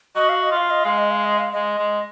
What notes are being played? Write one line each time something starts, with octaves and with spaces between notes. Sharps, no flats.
F#4 D#5
F5
D#5
F4
F5
D#5
G#3 F5
D#5
F5
D#5
F5
G#3 D#5
G#3